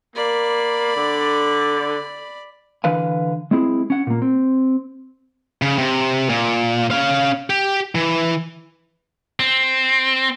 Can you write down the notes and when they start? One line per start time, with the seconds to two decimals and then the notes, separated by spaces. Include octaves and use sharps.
0.16 A#3 D5 B5
0.96 D3
2.84 D3 E3 B4 F5 G#5
3.51 G#3 C4 E4 G#4
3.90 C#4 F#5
4.07 A#2 A#3
4.22 C4
5.62 C#3
5.79 C3
6.29 A#2
6.91 C#4 F5
7.50 G4
7.95 E3
9.40 C4